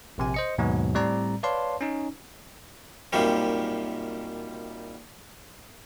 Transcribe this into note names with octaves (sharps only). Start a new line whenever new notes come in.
A#1 C3 G#5
C5 D#5 C#7
D#2 G#2 B2 F#3 B3
A2 G3 C4 D5 A#5
B4 C#5 D5 F5 A5 C6
C#4 D#4
F#2 A#2 D#3 G3 C4